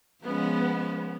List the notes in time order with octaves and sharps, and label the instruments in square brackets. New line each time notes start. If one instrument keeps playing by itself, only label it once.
[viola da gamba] F3 G#3 C#4 [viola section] B3